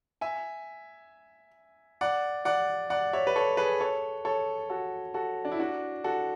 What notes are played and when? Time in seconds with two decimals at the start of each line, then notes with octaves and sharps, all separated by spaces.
0.21 E5 G#5
2.01 D5 F#5
2.45 D5 F#5
2.90 D5 F#5
3.13 C#5 E5
3.27 B4
3.36 A4 C#5
3.57 G#4 B4
3.80 A4 C#5
4.25 A4 C#5
4.70 F#4 A4
5.14 F#4 A4
5.45 D4
5.52 E4
5.59 D4 F#4
6.04 F#4 A4